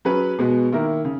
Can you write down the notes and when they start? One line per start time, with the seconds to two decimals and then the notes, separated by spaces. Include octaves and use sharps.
0.05 F#3 C#4 G#4 B4
0.39 B2 G#3 B3 F#4
0.72 D#3 A#3 E4 A#4
1.05 C#3